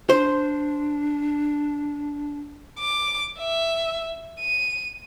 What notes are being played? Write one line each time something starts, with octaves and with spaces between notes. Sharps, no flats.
D4 C5
D6
E5
D#7